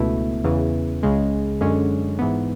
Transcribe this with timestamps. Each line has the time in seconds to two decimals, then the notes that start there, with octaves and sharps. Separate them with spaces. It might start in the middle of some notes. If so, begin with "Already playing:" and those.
Already playing: C#2 B2 A3 E4
0.44 E2 C#3 E3
1.03 C#2 C#3 G#3
1.61 F#2 D3 G#3 C#4
2.19 G#2 E3 B3